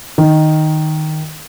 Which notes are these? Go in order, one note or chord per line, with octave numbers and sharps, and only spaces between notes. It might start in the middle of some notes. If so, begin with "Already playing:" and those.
D#3